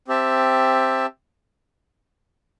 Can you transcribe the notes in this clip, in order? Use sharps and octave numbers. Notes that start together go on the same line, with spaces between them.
C4 G4 E5 A5